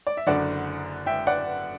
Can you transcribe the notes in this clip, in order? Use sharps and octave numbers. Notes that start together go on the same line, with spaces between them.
D5
E5
F#1 F#2 D3 D5 F#5
E5 G5
D5 F#5